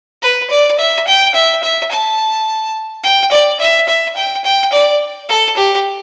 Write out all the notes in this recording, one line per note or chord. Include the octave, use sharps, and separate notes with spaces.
B4
D5
E5
G5
E5
E5
A5
G5
D5
E5
E5
G5
G5
D5
A4
G4